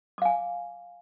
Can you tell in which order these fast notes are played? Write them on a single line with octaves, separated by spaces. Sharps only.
D6 F5 G#5